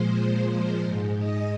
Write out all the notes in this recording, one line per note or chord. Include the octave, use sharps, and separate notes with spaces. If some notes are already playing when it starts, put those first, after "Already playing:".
Already playing: A#2 F3 G#3 C5
C5
G#2 G#3
D#5